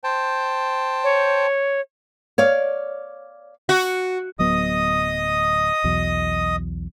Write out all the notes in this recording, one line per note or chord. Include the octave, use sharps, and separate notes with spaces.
C5 G5 A5
C#5
C#5 D5 F5
F#4
D1 F#3 B3 D#5 D#6
B1 E2 F#3